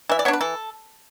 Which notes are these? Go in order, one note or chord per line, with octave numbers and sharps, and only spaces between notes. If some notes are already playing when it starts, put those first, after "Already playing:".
E3 E5
D5
B3 D4 C#5
B4
E3 A4